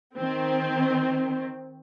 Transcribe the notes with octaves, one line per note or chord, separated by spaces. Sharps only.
D#3 C4